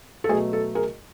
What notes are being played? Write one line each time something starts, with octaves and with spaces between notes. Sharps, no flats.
A4
B2 F#3 A3 G#4
A4
G#4 A#4